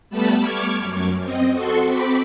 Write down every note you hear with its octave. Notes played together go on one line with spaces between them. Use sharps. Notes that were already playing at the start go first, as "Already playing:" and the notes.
G3 A3 B3 A5 B5
C#6 D6 F6 G#6
F#2
C4 D#5
F#4 A4 C6 C#6
C4 B5 D6 B6